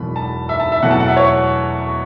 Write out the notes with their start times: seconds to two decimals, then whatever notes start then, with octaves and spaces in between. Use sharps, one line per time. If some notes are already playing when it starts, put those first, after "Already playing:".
Already playing: E1 E2 B2 F#3 B5
0.16 A5
0.49 E5
0.60 A5
0.72 E5
0.82 E2 B2 F#3 A3 F#5
0.91 A5
1.00 F#5
1.08 E5
1.17 C#5